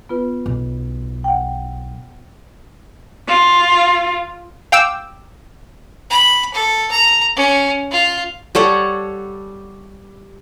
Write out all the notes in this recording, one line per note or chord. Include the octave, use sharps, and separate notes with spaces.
B3 F4 B4
B1
F#5 G5
F4
F5 G5 D6 E6
B5
A4
A#5
C#4
F4
G3 A4 C#5 F#5